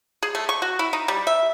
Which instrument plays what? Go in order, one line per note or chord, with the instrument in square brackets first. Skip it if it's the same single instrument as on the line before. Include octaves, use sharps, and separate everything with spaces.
[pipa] G#4
A3
C#6
F#4
E4
D#4
G3
E5